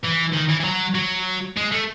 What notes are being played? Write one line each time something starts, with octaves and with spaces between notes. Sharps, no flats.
E3
D#3
E3
E3
F#3
F#3
G#3
A3